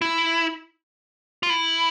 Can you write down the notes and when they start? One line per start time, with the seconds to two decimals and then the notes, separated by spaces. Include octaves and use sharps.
0.02 E4
1.43 F4
1.50 E4